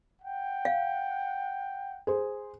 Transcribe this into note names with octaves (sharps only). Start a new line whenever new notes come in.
F#5 G5
F5
G#4 C5